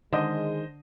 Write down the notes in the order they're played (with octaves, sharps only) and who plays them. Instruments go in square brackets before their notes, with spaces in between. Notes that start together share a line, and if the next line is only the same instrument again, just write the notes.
[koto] D3 [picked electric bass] D#3 [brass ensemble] G#3 [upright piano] C5 D#5